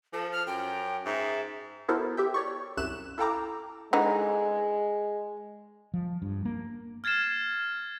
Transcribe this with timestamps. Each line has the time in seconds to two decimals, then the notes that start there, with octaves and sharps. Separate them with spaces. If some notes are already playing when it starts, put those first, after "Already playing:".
0.13 F3 A4
0.32 F6
0.47 F#2 G5
1.05 G#2 E5
1.88 B3 E4 F#4 A4 A#4 C5
2.17 G4 E5 G5
2.34 C#5 D5 C#6
2.77 C2 F#2 E5 F#6 E7
3.18 E4 A4 F5 G5 A#5 D6
3.93 D3 E3 G#3 D#4
5.94 F3
6.22 G2
6.45 A#3
7.04 F6 G#6 A6 C7 E7